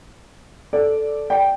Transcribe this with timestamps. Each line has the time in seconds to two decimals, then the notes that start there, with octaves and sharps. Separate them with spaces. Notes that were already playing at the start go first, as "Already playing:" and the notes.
0.73 A4 D5
1.30 D5 G5